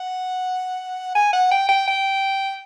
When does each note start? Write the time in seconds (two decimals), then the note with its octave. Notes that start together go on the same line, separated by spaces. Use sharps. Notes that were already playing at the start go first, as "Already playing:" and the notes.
Already playing: F#5
1.15 G#5
1.33 F#5
1.51 G5
1.69 G5
1.87 G5